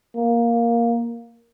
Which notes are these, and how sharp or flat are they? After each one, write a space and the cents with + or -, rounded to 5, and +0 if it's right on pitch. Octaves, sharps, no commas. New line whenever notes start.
A#3 +5